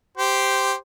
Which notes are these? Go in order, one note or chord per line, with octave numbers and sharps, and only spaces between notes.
G4 C5